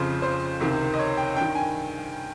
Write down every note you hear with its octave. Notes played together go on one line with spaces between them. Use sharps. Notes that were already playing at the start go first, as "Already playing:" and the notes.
Already playing: F2 C#3 F3 C5
C5
C#2 C3 D#3
D#5
C#5
G5
G2 D#3 G5
G#5